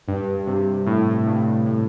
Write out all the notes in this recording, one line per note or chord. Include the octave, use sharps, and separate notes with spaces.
G2
C3
A2
G2
A2